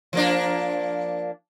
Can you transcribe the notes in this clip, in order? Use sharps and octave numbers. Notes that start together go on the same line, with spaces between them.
F3 A#3 D4